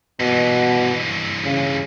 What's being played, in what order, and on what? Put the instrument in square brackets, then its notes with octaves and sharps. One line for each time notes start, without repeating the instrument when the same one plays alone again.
[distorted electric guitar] G2 E3 [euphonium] B2
[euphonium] C#3